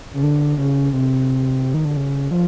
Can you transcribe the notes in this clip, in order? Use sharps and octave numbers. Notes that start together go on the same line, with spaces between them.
C#3
D3
C#3
C3
D#3
D3
C#3
F3